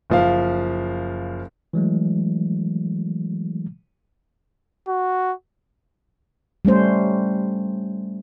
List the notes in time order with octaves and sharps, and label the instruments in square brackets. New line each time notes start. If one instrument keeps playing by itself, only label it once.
[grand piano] F#1 F3 F5
[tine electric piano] E3 F#3 G#3 A3
[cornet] F#4
[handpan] G3 A3 C#4 C5